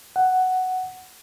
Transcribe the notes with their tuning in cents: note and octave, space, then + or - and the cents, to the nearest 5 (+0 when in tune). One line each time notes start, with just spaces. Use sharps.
F#5 +5